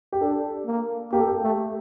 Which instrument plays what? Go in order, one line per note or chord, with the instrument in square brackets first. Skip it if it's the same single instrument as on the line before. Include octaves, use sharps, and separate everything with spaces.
[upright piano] G4
[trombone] D4 [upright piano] A4
[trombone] A#3
[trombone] A#3 [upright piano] G4
[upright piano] A4
G4
[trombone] A3